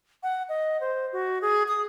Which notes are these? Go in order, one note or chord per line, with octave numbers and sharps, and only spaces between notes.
F#5
D#5
C5
F#4
G#4
D#6